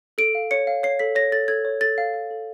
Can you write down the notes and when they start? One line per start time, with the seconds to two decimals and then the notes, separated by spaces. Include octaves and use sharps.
0.18 A4 D7
0.35 F5
0.51 C#5 C#7
0.67 F5
0.83 C#5 C7
0.99 A4 B6
1.15 C#5 A#6
1.32 A4 A6
1.48 A4 G#6
1.65 C#5
1.81 A4 A6
1.98 F5
2.14 F5
2.31 A4